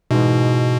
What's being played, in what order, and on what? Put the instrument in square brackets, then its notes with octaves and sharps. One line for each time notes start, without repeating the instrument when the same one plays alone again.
[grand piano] G#2 E3 G#3 D#4 [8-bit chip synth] B2